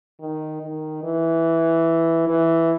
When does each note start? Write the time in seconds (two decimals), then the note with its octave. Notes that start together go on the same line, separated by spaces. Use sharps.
0.21 D#3
0.62 D#3
1.03 E3
2.27 E3